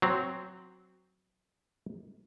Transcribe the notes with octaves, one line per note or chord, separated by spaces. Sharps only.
F#3 C4